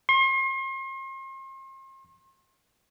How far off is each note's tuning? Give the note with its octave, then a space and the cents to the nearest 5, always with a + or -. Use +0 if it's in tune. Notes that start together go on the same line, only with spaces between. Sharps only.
C6 +40